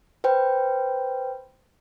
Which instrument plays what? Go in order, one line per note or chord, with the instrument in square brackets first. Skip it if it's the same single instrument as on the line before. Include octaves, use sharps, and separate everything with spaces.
[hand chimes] B4 C5 G5